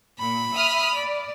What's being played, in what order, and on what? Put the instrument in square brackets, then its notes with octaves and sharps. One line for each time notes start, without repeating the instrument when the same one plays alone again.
[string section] A#2 [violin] B5
[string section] E5 D#6 F6
D5